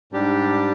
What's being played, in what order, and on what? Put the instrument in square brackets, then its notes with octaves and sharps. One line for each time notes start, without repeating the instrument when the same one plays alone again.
[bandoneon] G#2 G3 D4 G4